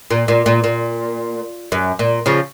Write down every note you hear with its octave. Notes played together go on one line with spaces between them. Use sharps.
A#2
A#2
A#2
A#2
F#2
A#2
C#3 F3